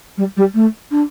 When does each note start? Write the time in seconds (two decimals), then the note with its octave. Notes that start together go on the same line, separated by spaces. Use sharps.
0.17 G3
0.36 G3
0.54 A3
0.91 D4